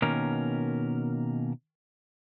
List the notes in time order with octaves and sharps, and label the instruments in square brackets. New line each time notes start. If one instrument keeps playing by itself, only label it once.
[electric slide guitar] B2 D#3 A#3 C#4 A#4